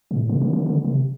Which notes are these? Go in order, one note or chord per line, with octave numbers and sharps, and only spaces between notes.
A2
C3
D3
D3
D3
C3